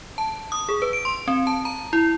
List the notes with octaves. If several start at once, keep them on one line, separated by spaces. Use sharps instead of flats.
A5
D#6
G#4
B4
D7
C6
C4
A5
A#5
E4